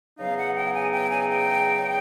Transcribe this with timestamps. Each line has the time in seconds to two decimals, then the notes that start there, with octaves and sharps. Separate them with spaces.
0.19 E2 C#3 F#3 B3 D#4 F5
0.38 F#5
0.56 G5
0.74 G#5
0.93 G5
1.11 G#5
1.29 G5